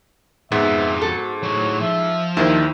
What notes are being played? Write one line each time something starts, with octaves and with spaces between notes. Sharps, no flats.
F2 G#2 G#3 B3 E5
F#4 A4
A2 F#3 C#5
F3 E5
D#2 D#3 D4 E4 C5